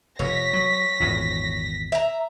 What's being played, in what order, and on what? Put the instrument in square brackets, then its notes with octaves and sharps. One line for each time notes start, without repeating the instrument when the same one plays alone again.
[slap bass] F1 [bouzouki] C#5 [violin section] A#6 B6
[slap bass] F#3
G#1 E2 A#2
[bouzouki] E5 A#5